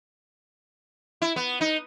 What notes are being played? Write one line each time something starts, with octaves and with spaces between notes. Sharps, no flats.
E4
B3
D#4